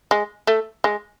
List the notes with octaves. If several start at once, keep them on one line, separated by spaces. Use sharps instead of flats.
G#3
A3
G#3